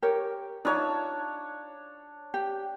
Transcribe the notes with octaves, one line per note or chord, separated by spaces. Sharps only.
G4 A#4 C#5
D4 D#4 F4 C#5 A5
G4